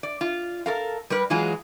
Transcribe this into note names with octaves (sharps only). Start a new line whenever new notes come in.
D5
F4
A4 A#4 F5
G3 A#4 B4
E3 F#3 G#3 F4 G#4